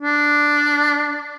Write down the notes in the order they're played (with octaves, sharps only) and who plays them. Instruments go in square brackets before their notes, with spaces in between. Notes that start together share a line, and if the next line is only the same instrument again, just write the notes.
[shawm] D4